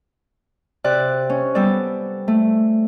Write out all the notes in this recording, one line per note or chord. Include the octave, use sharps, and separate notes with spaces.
C3 D5 F#6
C#4
G3 B3 A4 D5
A3